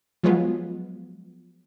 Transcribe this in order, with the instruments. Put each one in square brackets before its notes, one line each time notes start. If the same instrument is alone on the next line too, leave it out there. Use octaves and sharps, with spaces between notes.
[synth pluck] F3 F#3 G#3 B3 F4